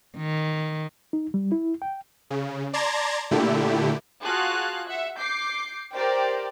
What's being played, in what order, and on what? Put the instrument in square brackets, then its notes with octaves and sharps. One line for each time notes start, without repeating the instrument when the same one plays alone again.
[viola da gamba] D#3
[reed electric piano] D#4
G3
E4
G5
[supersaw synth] C#3
D5 A5 A#5 C6 G#6 A#6
A#2 D3 A3 E4 G4
[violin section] F4 F#4 G#4 F5 A5 F#6
E5 F#5
D6 G6 C7
G4 A#4 C5 D5 G5